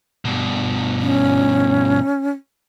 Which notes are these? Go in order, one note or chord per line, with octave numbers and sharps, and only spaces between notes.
G2 B2
C#4